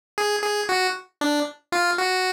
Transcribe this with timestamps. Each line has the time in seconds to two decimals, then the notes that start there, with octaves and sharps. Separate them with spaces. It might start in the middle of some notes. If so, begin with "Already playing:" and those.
0.18 G#4
0.43 G#4
0.69 F#4
1.21 D4
1.72 F4
1.98 F#4